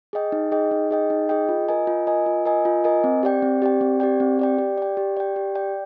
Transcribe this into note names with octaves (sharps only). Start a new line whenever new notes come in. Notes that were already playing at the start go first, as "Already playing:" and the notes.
G#4 D#5 G5
D#4
G#4 D#5 G5
D#4
G#4 D#5 G5
D#4
G#4 D#5 G5
F4
A#4 D#5 G#5
F4
A#4 D#5 G#5
F4
A#4 D#5 G#5
F4
A#4 D#5 G#5
C4
G4 D5 G5
C4
G4 D5 G5
C4
G4 D5 G5
C4
G4 D5 G5
G4
D5 G5
G4
D5 G5
G4
D5 G5